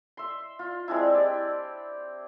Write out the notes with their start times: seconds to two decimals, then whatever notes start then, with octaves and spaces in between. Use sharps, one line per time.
0.17 E5 C6
0.59 F4
0.88 G#3 C4 D4 E4
1.14 G4 D5